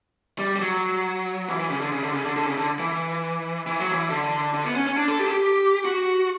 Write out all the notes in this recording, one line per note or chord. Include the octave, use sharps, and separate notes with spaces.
G3
G3
F#3
E3
E3
C#3
D3
C#3
D3
C#3
D3
D3
C#3
D3
E3
E3
F#3
E3
D3
D3
B3
C#4
C#4
D4
A4
G4
A4
G4
F#4